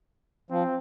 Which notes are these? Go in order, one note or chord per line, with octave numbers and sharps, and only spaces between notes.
F3 C4